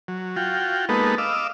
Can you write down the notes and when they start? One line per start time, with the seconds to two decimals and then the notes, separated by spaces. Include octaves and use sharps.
0.08 F#3
0.36 F4 F#4 G5
0.89 G#3 A#3 B3 D#4 A4 B4
1.18 D#5 F5 D6 E6